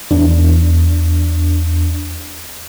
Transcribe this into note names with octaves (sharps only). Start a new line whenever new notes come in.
E2 D4